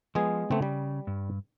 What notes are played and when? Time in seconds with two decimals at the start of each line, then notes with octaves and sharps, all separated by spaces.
0.15 F3 G#3 B3 G#4
0.51 C#3 A3 B3 C4
0.62 G3
1.07 G2